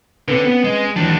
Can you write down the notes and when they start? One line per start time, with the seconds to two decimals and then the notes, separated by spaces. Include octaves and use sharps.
0.28 D3 C4 C#4 A4 B4
0.44 B3
0.64 G#3
0.96 D#2 E3 F#3 G#3 D4